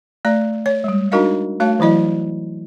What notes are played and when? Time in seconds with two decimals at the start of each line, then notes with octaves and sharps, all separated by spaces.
0.25 A3 D5 A#5
0.66 C#5
0.84 G3 G#3
1.12 D4 D#4 F#4 A#4 D#5 F5
1.60 A3 F#4 C#5 F5 A5
1.80 E3 F#3 E4 D#5